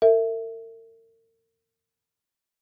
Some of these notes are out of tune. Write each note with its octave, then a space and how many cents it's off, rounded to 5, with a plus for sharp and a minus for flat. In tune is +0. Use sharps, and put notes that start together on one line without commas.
A#4 -45 E5 +0